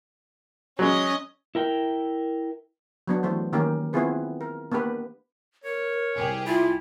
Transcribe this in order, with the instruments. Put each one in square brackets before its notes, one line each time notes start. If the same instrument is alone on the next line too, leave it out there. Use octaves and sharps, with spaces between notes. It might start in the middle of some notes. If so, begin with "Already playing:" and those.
[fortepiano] F#3 G#3 [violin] C#4 D#5
[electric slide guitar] E4 A#4 G5
[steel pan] F#3 B3 D4
E3 A3 G4 C5
D#3 A#3 C#4 G4 A#4
B3 C4 E4 F4 G#4 B4
A#4
A#3 B3 D4 G4 B4
[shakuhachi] A#4 [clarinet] C#5
[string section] C2 G4 G#4
[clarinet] E4 [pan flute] F4 [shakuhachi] E5